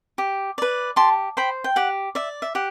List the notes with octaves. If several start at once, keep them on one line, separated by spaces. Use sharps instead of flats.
G4
B4 D5
G4 A5 C6
C5 G5 B5
G5
G4 F#5
D5 E5
E5
G4 F#5